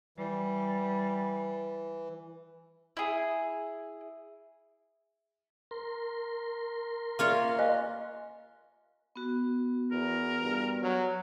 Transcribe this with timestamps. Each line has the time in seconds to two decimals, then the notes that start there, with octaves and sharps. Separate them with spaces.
0.17 E3 G3
2.97 E4 G#4
5.71 A#4 C6
7.19 A#3 F4 C#5 D5 E5 F5
7.59 D#5 F5 G#5 F#6
9.16 B3 F#4
9.91 E2 A#4
10.42 G2
10.83 F#3